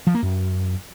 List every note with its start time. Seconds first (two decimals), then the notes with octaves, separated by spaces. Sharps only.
0.07 F3
0.15 A#3
0.22 F#2